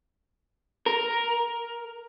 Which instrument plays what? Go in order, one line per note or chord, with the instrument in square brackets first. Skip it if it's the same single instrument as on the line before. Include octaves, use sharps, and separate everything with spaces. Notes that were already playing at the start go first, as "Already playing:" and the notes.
[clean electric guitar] A#4